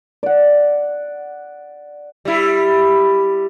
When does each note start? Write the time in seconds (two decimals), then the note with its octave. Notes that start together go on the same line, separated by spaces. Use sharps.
0.23 D5 F#5
2.25 G3 E4